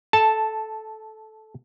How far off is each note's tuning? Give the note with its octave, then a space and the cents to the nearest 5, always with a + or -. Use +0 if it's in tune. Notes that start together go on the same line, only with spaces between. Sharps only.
A4 -15 A5 +0